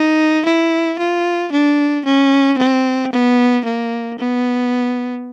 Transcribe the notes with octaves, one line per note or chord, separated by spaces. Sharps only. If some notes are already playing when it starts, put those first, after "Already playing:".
Already playing: D#4
E4
F4
D4
C#4
C4
B3
A#3
B3